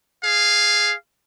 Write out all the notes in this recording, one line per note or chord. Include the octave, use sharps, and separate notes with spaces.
G#4 F5